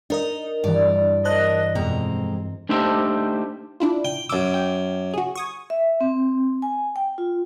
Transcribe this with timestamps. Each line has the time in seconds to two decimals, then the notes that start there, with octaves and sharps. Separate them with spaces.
0.10 D4 D#4 A#4 D#5
0.64 G2 E3 D5
1.25 A#4 C5 D#5 A5 F#6
1.75 F2 B2 G#3 C4 A#5
2.69 A3 D4 D#4 G4 C5 E5
3.80 D4 E4 F4
4.05 G5
4.30 F#2 D6 E6
4.54 G5
5.14 F#4 G#4
5.35 C#6 D#6 G#6
5.70 E5
6.01 C4
6.62 G#5
6.96 G5
7.18 F4